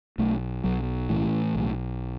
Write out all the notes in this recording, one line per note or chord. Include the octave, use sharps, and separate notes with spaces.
B1 A3
B1 F#3
A2 E3
B1